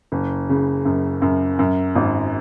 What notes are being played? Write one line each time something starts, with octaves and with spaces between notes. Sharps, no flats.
F#1
C#3
F#2
F#2
F#2
G#1